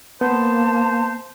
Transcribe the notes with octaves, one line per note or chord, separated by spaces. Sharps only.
A#3 B3 C5 A5